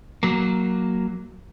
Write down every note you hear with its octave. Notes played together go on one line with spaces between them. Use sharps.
F#3 A#3